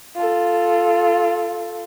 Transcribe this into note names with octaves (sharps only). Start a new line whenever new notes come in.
F4 A4